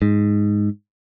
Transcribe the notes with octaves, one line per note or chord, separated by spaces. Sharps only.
G#2